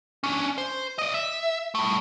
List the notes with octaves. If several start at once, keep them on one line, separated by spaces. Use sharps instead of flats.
C#4 D4
C5
D5 D#5
E5
G3 A3